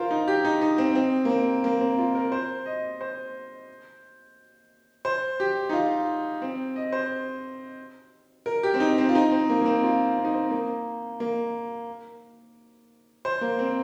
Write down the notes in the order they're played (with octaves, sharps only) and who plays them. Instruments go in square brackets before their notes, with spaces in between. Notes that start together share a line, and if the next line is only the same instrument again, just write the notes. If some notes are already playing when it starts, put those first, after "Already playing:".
Already playing: [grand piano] F4 A#4 C5
D#4
G4
D#4
D#4
C4
C4
A#3
C4
A#3
C4
F4
A#4
C5
D#5
C5
C5
G4
D#4
F4
C4
D#5
C5
A#4
G4
C4
D#4
C4
F4
D#4
C4
A#3
A#3
C4
F4
C4
D#4
C4
A#3
A#3
C5
A#3
C4